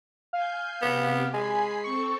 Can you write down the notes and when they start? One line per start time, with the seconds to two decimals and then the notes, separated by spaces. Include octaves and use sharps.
0.33 F5 G#5 G6
0.82 C3 B3 G4
1.34 G#3 G#5 B5 C7
1.84 C4 A4 C#6